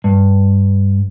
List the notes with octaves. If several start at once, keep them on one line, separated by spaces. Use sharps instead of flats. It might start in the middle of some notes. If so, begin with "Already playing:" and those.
G2